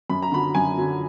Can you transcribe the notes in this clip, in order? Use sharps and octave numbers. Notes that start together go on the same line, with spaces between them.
F#2 B5
A#5
D3 F#3 B5
F#2 G#5
D3 F#3